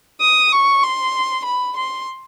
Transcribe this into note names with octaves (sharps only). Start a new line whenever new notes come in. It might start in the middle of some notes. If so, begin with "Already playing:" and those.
D#6
C#6
C6
B5
C6